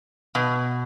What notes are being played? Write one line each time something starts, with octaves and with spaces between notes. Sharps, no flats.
B2